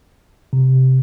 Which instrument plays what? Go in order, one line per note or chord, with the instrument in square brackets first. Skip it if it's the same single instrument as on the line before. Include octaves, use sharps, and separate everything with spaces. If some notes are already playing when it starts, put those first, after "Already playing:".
[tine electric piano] C3